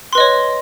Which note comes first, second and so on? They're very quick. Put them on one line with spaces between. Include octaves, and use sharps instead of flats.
C6 B4 D#5 C#5